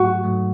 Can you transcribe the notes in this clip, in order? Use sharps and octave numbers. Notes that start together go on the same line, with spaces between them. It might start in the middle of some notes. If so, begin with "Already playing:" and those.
Already playing: G#2 F#3 A3 F#4
G#2 F#3 A3